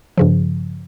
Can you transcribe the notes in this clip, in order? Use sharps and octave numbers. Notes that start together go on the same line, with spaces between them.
G2 C#3 F3